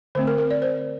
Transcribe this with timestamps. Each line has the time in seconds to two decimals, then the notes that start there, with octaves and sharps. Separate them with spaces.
0.15 D3 A3 C4 C5
0.27 A#4
0.38 A#4
0.51 D5
0.62 C5